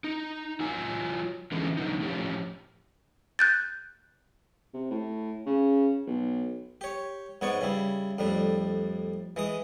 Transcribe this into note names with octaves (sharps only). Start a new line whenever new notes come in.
D#4
F#3 F4 G#5
D3 E3 F3 G#3 A3 C#4
D3 F#3 D#4
A2 F3 C#4 G4
F#6 G6 A6
C3
A2
C#3
B1
G4 C#5
G#2 B3 C#5 D5 C#6
C#3 G3 E4
F2 A2 G3 D4
E3 G#3 D#6